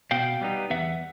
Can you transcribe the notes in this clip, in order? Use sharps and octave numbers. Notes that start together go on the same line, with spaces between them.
B2 F5 G5
G3 B3 D#4
E2 E5 F#5